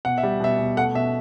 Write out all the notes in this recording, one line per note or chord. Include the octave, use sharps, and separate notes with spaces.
B2 F#5
E5
G3
B2 E5
B2
A3 F#5
B2 E5